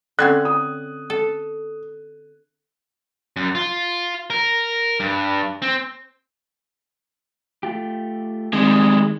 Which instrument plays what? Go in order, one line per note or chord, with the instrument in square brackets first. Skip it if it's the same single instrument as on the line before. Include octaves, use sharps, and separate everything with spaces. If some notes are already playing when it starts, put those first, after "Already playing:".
[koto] D3 C4 C#4 [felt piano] F#6 G#6
[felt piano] D#6
[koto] A4
[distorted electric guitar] F#2
F4
A#4
G2
C4
[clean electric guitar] A3 F4 G4
[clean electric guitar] D#3 [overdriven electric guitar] G3 G#3 [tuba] C4